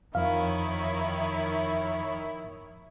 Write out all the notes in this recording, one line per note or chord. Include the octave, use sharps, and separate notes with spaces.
F2 D#3 F3 E4 C#5 F5 B5